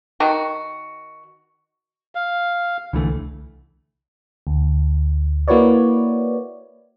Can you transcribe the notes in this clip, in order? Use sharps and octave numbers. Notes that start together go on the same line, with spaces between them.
D#3 F#4
F5
C2 D3 E3 A3
D2
A#3 E4 F#4 B4 C#5 D5